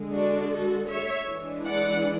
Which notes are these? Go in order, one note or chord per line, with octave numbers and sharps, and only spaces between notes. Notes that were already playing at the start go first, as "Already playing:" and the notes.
Already playing: D3 G#3
D4 F#4
F#4 A4
C#5 E5
E3 G#3 D4
D5 F#5